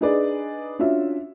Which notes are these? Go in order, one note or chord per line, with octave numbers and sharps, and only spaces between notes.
D4 D#4 G#4 B4 D5
C#4 D4 F4 F#4 E5